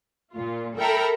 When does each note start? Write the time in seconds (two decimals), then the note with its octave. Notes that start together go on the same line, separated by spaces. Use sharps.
0.33 A#2 F4
0.77 A4 A#4 E5 G5 A#5 B5